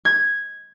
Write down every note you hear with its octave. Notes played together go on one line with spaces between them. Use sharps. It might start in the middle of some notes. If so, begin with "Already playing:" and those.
G#6